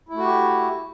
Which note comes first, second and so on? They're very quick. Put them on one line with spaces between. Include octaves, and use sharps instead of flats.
E4 A3 F#4 G4